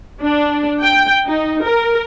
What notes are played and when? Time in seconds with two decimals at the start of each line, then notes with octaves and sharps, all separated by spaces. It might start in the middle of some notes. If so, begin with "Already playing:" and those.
0.21 D4
0.82 G5
1.26 D#4
1.63 A#4